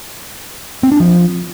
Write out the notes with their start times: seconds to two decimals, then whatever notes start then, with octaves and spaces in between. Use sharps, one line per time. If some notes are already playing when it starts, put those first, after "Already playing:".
0.83 C4
0.92 D4
1.00 F3